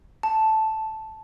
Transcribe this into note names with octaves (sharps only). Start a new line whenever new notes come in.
A5